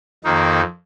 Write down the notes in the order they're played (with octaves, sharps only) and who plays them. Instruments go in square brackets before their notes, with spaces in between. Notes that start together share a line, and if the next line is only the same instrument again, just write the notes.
[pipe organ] F2 D#3 A#3 D#4